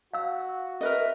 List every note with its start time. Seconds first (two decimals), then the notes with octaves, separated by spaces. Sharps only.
0.14 F#4 F5 E6
0.81 A#4 B4 D#5 E5